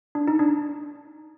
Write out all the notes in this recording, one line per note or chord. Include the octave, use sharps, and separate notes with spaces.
D4
D#4
D4